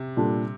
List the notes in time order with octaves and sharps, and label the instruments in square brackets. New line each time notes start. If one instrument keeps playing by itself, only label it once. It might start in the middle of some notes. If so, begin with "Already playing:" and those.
Already playing: [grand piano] C3
[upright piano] A#2 G3 D4 A4